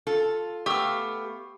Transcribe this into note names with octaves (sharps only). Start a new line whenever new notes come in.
F4 A4
A3 B3 G4 F5 E6